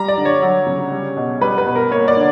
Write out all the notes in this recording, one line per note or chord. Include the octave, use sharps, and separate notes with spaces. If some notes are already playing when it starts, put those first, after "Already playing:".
Already playing: G3 A#5
D5
D3
C#5
F#3
C#3
G3
B2
G3 B4
B4
B2
A#4
A#3 C#5
D5
D3